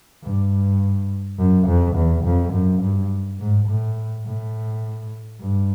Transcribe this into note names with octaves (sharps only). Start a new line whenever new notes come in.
G2
F#2
F2
E2
F2
F#2
G2
G#2
A2
A2
G2